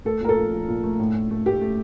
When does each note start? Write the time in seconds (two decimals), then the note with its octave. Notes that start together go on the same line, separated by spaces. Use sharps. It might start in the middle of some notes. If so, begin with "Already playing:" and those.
0.05 A3 A4
0.21 A#2 A#4
0.29 A4
0.37 F3
0.53 F3
0.68 A#2
0.83 A3
0.99 A2
1.14 A2
1.31 A3
1.46 A3 G4
1.61 A3